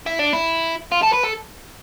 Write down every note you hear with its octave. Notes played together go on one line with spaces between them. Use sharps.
E4
D4
E4
F4
A4
B4
A4